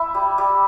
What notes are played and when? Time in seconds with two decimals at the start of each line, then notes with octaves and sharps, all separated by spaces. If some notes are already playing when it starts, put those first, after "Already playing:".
Already playing: E4
0.14 G3
0.38 G3